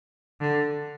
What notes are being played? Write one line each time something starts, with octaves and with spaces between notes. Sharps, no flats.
D3